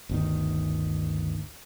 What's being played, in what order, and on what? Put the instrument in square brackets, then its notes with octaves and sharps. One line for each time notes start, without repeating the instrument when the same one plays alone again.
[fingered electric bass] G1 D2 D#3